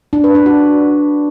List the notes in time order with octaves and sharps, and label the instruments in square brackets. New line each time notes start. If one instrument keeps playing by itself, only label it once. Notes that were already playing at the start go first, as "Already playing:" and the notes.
[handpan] D4
B4
D4
F#4